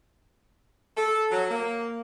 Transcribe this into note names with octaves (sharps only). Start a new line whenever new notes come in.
A4
F#3
A#3